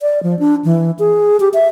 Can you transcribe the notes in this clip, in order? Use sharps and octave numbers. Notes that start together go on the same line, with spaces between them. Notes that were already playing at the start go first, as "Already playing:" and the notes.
D5
F3
D4
E3
G#4
G4
E5